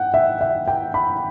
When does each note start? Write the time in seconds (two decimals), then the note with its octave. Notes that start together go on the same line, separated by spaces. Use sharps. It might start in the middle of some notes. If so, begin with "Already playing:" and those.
Already playing: F#5 G5
0.14 E5
0.41 E5
0.68 G5
0.94 B5